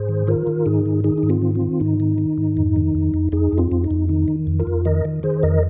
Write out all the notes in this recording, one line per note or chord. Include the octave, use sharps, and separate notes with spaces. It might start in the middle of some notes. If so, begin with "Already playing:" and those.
Already playing: G#2 G#4 C5
D#3
D#3 F4 A#4
D#3
G#2 D#4 G#4
D#3
D#3 D#4 G#4
D#4
G#2
C4 F4
D#3
C4 F4
D#3
G#2 D#4
D#3
D#3
G#2
F2
D#3
F2
F2
F2 D#4 G#4
F2
C4 F4
F2
D#4
F2
D#3 D#4
D#3
F2
F4 A#4
F2
D#3 A#4 D#5
D#3
D#3 G#4 C5
F2 A#4 D#5